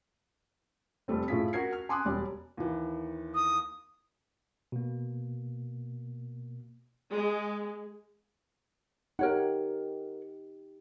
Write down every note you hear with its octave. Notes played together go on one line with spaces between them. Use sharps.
F1 G3 A3 C4
A2 A3 F4 G#4 B6
F#4 A#4 G#6 C7
F6
G#5 C6 D6 D#6 F#6
E1 G3 D5
D#2 E3
D#6
B2 A#3
G#3
D#4 G4 A#4 C#5 F#5